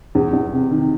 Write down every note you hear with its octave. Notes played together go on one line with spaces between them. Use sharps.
E2
E2
C3
D#3